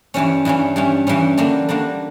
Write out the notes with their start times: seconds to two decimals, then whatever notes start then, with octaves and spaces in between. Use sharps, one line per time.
0.14 G2 E3 G3 C#4
0.45 G2 E3 G3 C#4
0.76 G2 E3 G3 C#4
1.07 G2 E3 G3 C#4
1.38 D3 G3 A#3 D4 F#4
1.69 D3 G3 A#3 D4 F#4